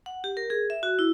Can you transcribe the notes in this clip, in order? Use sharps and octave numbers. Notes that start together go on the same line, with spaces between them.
F#5
G4
A#4
G#4
E5
F#4
E4